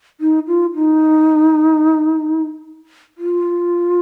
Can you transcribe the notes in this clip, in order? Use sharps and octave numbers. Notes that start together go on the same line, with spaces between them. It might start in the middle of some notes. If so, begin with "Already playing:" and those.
D#4
F4
D#4
F4